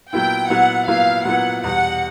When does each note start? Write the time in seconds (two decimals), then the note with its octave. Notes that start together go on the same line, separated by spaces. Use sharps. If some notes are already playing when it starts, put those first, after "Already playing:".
0.12 A#2 F#3 B3 E4 G5
0.50 A#2 F#3 B3 E4 F#5
0.88 A#2 F#3 B3 E4 F5
1.25 A#2 F#3 B3 E4 F#5
1.64 E2 B2 G3 F#5